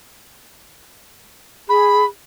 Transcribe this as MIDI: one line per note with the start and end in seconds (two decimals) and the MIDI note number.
1.69 2.03 68
1.69 2.05 83